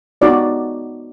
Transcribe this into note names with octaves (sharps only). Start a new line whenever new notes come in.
B3 D#4 F#4 D5